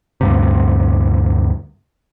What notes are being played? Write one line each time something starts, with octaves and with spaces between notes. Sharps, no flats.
D2 G2 C3